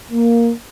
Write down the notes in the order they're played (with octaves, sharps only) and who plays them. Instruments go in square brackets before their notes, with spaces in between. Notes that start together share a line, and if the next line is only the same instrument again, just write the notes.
[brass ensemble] A#3